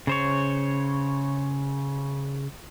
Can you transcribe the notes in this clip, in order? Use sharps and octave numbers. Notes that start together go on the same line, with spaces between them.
C#3 C5 C#5